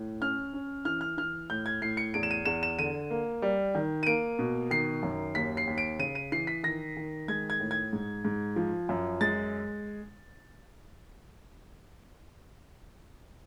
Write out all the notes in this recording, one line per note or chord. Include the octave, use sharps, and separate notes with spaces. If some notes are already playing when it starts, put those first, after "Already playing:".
Already playing: A2
C#4 F6
C#4
E3 F6
F6
E3 F6
A2 G6
G#6
A2 C7
C#7
E2 D7
E7
D#7
E2 E7
E7
D3 D#7
A#3
G3
D#3
D#7
A#3 D7
B2
D#3 C7
F#2
D#2 B6
C7
D#2
D7
C#3 D#7
D#7
E3 C7
B6
D#3 A#6
D#3
G#3 G#6
G#6
A2
G#6
G#2
G#2
F3
F#2
G#3 A6